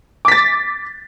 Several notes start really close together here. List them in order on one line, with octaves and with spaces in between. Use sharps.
D6 B6 A6